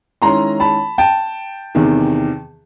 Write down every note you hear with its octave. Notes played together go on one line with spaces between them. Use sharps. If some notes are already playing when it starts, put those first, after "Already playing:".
D#3 G#3 C#4 E4 A#5 C6
A5 B5
G5 A5
E2 C3 D#3